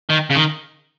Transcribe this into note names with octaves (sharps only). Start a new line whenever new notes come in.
D#3
C#3
D#3